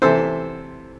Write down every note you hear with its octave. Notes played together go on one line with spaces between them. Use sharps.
C3 E3 A4 C5